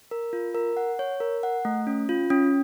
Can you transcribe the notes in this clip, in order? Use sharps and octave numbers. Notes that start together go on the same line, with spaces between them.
A#4
F4
A#4
F#5
C#5
A#4
F#5
A3
C#4
F4
C#4